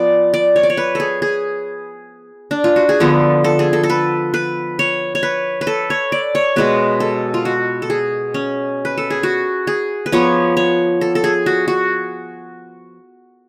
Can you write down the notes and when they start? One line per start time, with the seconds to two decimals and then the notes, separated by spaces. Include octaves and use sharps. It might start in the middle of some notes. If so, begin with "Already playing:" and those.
Already playing: F3 B3 D5
0.34 D5
0.56 C#5
0.63 D5
0.70 C#5
0.77 B4
0.95 G#4 A4
1.22 G#4
2.51 D4
2.64 F4
2.76 F#4
2.89 G#4
3.00 D3 F3 B3 A4
3.44 A4
3.59 G#4
3.73 A4
3.83 A4
3.90 B4
4.34 B4
4.79 C#5
5.15 C#5
5.23 B4
5.61 B4
5.67 A4
5.90 C#5
6.12 D5
6.35 C#5
6.56 B2 G#3 B3 B4
7.00 A4
7.34 F4
7.45 F#4
7.82 A4
7.90 G#4
8.34 C#4
8.85 B4
8.97 A4
9.10 G#4
9.23 F#4
9.67 G#4
10.06 B4
10.12 F3 B3 C#5
10.57 C#5
11.01 A4
11.15 A4
11.24 G#4
11.46 F#4
11.68 F#4